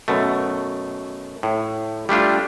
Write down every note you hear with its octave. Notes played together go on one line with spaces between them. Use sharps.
F#2 B2 A3
A2
G3 A3 D4 F4